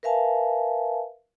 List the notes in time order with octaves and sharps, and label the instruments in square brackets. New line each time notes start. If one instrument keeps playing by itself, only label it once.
[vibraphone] A#4 B4 E5 F5 G#5 A5